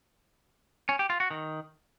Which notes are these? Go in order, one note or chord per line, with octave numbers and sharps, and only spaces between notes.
C#4
G4
F4
F#4
D#3